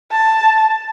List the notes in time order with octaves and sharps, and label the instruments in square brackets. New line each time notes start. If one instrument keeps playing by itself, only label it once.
[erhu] A5